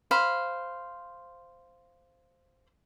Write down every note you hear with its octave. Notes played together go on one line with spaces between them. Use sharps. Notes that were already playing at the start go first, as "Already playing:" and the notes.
C5 F5 B5